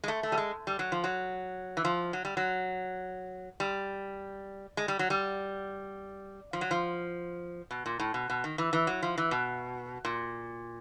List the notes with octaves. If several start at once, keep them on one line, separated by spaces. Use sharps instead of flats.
G#3
A3
A3
G3
G#3
G3
F#3
F3
F#3
E3
F3
F#3
G3
F#3
G3
G#3
G3
F#3
G3
F3
F#3
F3
B2
A#2
A2
B2
B2
D#3
E3
E3
F#3
F3
E3
B2
A#2